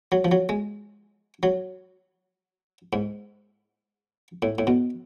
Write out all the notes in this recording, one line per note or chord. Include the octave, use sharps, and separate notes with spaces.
F#3
F3
F#3
G#3
F#3
G#2
A2
A2
B2